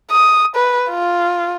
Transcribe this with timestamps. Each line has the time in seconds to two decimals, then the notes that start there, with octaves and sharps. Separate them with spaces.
0.11 D#6
0.55 B4
0.90 F4